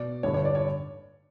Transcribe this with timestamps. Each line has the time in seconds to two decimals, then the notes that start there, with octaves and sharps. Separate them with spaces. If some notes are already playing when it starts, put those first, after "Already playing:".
Already playing: B2 D5
0.23 G1 G2 D3 C#5
0.34 C#5
0.45 D5
0.55 C#5